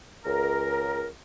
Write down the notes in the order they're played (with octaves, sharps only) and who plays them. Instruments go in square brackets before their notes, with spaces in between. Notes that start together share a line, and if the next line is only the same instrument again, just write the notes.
[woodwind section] C#2 A#4